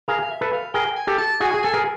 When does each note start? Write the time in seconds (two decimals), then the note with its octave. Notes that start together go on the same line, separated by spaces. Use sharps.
0.08 G#4 A#4 F5
0.23 F5
0.31 E5
0.41 A4 B4
0.53 F5
0.74 G#4 A#4 G5
0.97 G#5
1.07 G4 A4
1.19 A5
1.40 F#4 G#4 G#5
1.54 G#4
1.63 A4 G#5
1.73 G#4 A#4